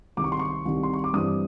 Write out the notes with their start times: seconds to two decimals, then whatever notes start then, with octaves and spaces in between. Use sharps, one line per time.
0.17 C2 C3 D#3 G3 D6
0.24 C#6
0.32 C6
0.39 C#6
0.65 C2 C3 D#3 G3
0.83 C6
0.94 C#6
1.04 D6
1.14 G2 E3 G3 C4 D#6